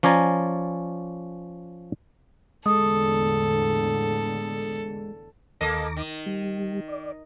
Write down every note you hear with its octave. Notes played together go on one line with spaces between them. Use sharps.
F3 C#4 D5 G#5 A#5
E2 A2 D3 G#3 A4 D#6
D#2 A#3 A4 D#5 A#5 D6
D#3
G3
D5